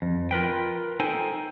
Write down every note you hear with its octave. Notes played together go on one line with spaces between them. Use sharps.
F2
F4 A#4 B4 G5
D#4 A4 C5 G5 G#5